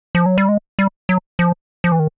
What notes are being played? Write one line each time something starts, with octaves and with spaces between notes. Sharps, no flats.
F3
F#3
G3
G#3
G3
F#3
F3
F3
E3
D#3